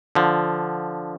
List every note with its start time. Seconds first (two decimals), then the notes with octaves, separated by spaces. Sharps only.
0.15 D3 F3